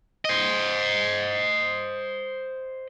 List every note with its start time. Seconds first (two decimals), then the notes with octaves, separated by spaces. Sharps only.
0.25 C5 D#5